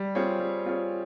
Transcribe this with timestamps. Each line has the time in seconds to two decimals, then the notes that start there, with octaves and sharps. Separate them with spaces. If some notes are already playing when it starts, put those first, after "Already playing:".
Already playing: G3
0.15 C4 F4 G#4 C#5
0.40 G3
0.66 C4 F4 G#4 C#5